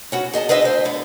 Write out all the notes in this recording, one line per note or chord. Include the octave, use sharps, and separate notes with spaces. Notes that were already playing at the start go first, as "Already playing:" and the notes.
C#4 F#4 B4
G#4 D#5 E5 A5
G#4 B4 C5 D#5 E5
D2 C5
D3 B3